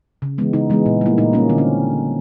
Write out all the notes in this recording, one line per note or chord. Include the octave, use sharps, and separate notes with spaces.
C#3
E3 G#3 B3
C#3 D#4
E3 G#3 B3
A#2
G3 A#3 E4
A#2 D#4
G3 A#3 C#4
D3 C4
C#4